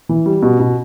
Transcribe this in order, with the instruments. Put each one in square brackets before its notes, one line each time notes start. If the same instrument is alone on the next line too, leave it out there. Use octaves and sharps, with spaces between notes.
[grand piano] E3
G3
B2
B2